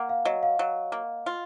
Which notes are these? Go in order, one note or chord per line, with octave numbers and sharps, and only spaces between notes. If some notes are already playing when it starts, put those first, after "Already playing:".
Already playing: A#3 F#5
F5
F#3 D#5
F5
F#3
A#3
F4